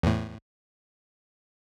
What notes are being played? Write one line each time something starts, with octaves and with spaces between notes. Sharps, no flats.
E2 A2